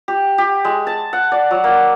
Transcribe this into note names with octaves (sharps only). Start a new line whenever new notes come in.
G4
G4
G#3
A5
F#5
D5
F#3
A#3